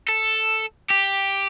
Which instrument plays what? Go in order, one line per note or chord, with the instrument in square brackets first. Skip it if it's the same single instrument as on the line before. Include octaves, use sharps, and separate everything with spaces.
[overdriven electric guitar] A4
G4